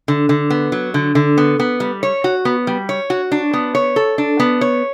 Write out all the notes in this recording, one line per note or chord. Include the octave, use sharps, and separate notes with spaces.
D3
D3
B3
F#3
D3
D3
B3
B3
G3
C#5
F#4
B3
G3
C#5
F#4
D4
B3
C#5
A4
D4
B3
C#5